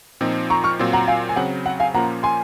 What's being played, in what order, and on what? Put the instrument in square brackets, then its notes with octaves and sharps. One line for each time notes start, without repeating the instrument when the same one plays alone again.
[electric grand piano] A#2 F3 C4 D#4
[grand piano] A#5 C#6
C#6 F6
[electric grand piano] A#2 F#3 C4 F4
[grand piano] F#5 A#5
F5 G#5
G#5
[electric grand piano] C#3 F#3 C4 [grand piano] F#5
[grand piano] F#5
F5 G#5
[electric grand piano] A#2 F3 A#3 C#4 F4 [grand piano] F#5 A#5
[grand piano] G#5 C6